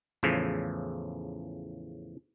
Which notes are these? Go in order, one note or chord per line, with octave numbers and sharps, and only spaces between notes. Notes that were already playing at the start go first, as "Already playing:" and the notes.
E2 A2 C#3 F3